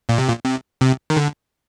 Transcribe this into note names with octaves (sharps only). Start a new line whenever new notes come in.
A#2
C3
A#2
C3
C3
D#3
D3